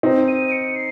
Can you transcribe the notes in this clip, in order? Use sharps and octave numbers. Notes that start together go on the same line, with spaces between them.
C4 D#4
D#7
D#7
C#7
C7